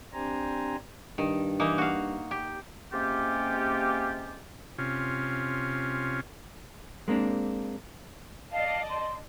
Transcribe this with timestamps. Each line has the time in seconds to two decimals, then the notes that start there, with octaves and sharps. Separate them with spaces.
0.13 C4 D4 G4 C5 G#5 A#5
1.18 G2 D#3
1.60 E3 A#3 D#4
1.78 F#4 F5
2.31 G4
2.93 C3 G#3 A#3 C#4 F4 G4
4.78 C3 C#4 F4
7.08 G#3 A#3 C4 D4
8.52 D5 D#5 F5 A5
8.89 C6